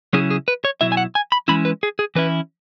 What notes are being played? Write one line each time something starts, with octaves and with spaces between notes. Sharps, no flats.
C#3 F#3 C#4 E4 G#4
G#4
B4
C#5
B2 F#3 E4 E5
G#5
F#5
G#5
B5
E3 G#3 C#4 E4 B5
B4
G#4
G#4
E3 C#4 E4 B4